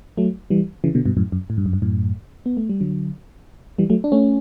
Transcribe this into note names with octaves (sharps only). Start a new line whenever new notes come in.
F#3 A3
E3 G3
C#3 E3
B2 D3
G2 B2
F#2 A2
F#2
A2
G2
F#2
G2
F#2 A2
B3
A3
G3
D3 F#3
E3 G3
F#3 A3
D4
A3 C#4